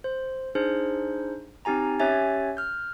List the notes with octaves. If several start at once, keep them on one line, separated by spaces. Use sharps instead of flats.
C5
D4 D#4 G#4 C5
C4 D#4 G4 G#5 A#5
C#4 G4 C#5 E5 G#5 A6
F6 G6